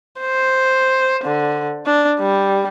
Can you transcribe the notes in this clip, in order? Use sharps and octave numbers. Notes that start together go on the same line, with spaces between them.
C5
D3
D4
G3